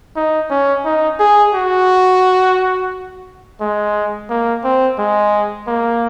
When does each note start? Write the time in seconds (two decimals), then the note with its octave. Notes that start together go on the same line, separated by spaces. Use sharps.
0.16 D#4
0.50 C#4
0.85 D#4
1.19 G#4
1.54 F#4
3.61 G#3
4.30 A#3
4.64 C4
4.99 G#3
5.67 A#3